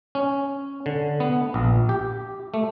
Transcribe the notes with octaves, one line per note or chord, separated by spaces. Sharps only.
C#4
D3
B3
A#1
G4
A3